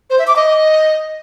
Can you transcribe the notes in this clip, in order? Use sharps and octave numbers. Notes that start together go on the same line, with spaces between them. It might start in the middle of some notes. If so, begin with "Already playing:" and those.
C5
E5
D6
D#5